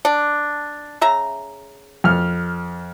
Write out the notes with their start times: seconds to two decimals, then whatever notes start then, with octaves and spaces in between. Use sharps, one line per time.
0.05 D4
1.01 C#3 E5 A#5
2.04 F2 F6